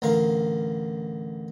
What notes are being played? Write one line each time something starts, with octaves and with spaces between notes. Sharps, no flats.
A1 D3 A#4 F5